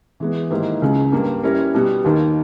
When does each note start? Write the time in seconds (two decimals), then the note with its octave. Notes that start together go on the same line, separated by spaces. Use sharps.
0.20 E3 G#3 B3
0.51 G#2 D#3 A#3 E4 G4
0.82 C#2 C#3 G#3
1.12 G2 G3 A#3
1.43 G3 C#4 E4 A#4
1.74 B2 G3 B3
2.04 D#2 D#3 A#3